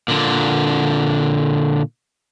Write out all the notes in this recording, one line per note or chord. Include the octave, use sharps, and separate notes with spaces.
A#2 D3